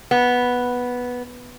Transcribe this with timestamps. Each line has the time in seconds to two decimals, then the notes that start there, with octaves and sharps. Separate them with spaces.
0.11 B3